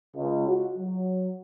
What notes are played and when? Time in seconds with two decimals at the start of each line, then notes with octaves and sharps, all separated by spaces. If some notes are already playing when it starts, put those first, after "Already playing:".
0.16 C#2
0.49 F#4
0.78 F#3